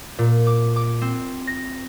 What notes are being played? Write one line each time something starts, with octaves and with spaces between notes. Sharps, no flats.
A#2
D6
D6
C4
A#6